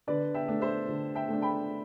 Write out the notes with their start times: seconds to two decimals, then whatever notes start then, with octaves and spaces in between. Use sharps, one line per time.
0.07 D3 B4 D5
0.34 E5 G5
0.48 A3 D4
0.61 C5 E5
0.89 D3
1.15 E5 G5
1.29 A3 D4
1.42 G5 B5